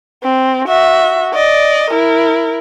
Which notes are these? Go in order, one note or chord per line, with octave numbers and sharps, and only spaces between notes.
C4
F#4 E5
D5 D#5
E4 A#4